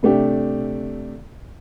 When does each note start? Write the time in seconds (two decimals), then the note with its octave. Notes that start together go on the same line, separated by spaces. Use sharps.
0.03 C3 A3 D4 G4